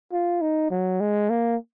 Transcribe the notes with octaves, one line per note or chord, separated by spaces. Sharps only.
F4
D#4
F#3
G#3
A#3